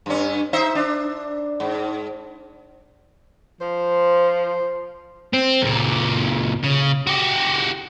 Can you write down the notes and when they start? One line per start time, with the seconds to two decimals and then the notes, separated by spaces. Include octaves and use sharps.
0.06 G2 C#4
0.53 D#4 C5 E5
0.75 D4
1.60 G#2
3.61 F3 C5
5.34 C4
5.62 C#2 A#2
6.64 C#3
7.07 F#4 G4